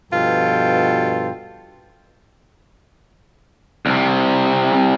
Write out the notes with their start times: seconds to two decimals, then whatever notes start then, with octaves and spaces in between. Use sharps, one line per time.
0.12 G2 B2 F3 F4 A4 G5
3.86 C2 C3